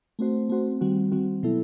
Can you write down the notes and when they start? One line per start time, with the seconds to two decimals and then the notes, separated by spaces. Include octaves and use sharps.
0.19 A3 C4 F#4 C5
0.49 A3 C4 F#4 C5
0.81 D#3 G3 C4 F#4
1.12 D#3 G3 C4 F#4
1.43 B2 F#3 B3 E4 A4